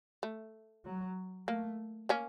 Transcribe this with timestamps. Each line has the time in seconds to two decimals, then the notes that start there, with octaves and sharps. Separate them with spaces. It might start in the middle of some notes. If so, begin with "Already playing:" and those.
0.23 A3
0.85 F#3
1.48 A3 A#3
2.09 A#3 C#4